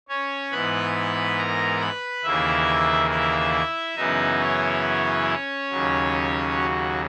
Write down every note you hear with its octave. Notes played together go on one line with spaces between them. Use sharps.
C#4 C#5
G#2 E3 B3 B4 B5
A#4 A#5
B4 B5
D#2 C#3 E3 A#3 E4 E5
E4 E5
F#2 C#3 E3 B3 D#4 E4 D#5
C#4 C#5
D#2 C#3 F#3
F#4